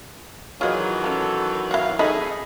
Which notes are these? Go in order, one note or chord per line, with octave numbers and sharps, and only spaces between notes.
D#3 E3 F#3 F4 F#4 G#4 D#5
F3 C#4 A4
E4 F#4 F5
D#4 G#4 A4 D#5 B5